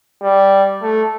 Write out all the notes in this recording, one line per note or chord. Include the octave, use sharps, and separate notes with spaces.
G3
A3